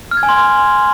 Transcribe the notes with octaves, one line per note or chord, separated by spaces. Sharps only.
F6
G#6
G#5
C6